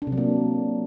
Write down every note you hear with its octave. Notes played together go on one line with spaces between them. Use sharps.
D4
C3
F#3
A#3